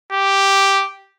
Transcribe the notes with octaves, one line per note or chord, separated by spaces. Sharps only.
G4